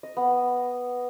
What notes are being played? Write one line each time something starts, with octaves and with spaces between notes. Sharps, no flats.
D#5
B3